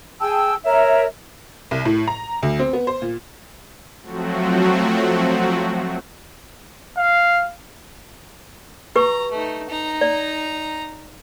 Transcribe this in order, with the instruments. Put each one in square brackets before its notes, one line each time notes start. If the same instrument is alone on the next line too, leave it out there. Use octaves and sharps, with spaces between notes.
[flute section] G#4 G5 A5 E6
A#4 C#5 E5
[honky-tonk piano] C2
A2
A#5
D2
C4
B3
C5
A#2
[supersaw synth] F3 F#3 A3 C4 F#4
[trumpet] F5
[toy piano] G4 B4 C#6 [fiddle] A#5
[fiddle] A3 D#4
D#4 A#5
[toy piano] D5